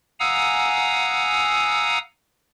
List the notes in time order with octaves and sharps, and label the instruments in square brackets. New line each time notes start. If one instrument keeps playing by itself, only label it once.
[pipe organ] F5 F#5 G#5 A#5 D#6 E6